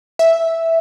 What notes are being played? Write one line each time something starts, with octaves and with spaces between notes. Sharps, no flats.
E5